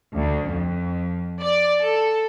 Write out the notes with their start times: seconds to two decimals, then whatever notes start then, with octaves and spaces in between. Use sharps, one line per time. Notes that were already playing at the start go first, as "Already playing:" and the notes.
0.13 D2
0.48 F2
1.40 D5
1.81 A4